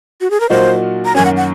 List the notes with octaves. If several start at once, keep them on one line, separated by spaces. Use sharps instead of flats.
F#4
G#4
A#4
A#2 F#3 A#3 D#4 F#4 C5
A#5
F#2 D#3 A#3 C#4 G#5
F#5
F#5